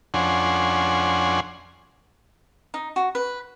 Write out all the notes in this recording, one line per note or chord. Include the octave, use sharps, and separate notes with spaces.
F2 C#4 D4 F#5 G#5 C6
D#4
F#4
B4